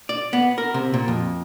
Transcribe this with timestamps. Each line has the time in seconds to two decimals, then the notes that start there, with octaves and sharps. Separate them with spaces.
0.09 D5
0.33 B3
0.58 A#4
0.74 C3
0.94 A#2
1.08 F2